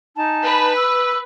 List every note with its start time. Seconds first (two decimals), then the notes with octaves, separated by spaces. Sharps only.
0.16 D#4 G#5 A5
0.44 B4
0.77 E6